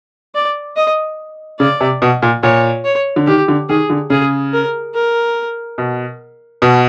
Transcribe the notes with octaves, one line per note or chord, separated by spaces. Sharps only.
D5
D#5
C#3 D5
C3
B2
A#2
A#2 C#5
C#5
D3
D#3 G4
D3
D#3 G#4
D3
C#3 G#4
A#4
A#4
B2
B2